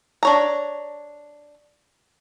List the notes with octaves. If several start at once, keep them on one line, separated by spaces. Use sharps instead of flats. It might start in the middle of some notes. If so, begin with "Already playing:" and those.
D4 C#5 A#5